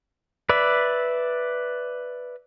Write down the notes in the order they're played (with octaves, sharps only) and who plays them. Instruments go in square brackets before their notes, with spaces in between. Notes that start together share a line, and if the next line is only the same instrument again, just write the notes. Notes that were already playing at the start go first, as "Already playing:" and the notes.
[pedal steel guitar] B4 D5 E5